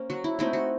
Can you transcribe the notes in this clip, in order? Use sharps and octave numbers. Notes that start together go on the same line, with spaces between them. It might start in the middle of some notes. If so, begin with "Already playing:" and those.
Already playing: A#3 C#4 C5
F#3 F#4
E4
A3 C4 D#4 E4
F#4